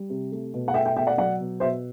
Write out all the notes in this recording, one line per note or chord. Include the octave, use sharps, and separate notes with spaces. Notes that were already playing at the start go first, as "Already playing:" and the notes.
Already playing: G3
C3
A3
B2
F#5
A3 E5 G5
E5 G5
B2 E5 G5
D5 F#5
F#3 D5 F#5
B2
B2 C5 E5